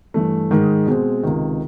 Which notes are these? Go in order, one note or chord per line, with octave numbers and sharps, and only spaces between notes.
G2 E3 A3
G#2 D#3 G#3
B2 G#3 C4
C#2 C3 D#3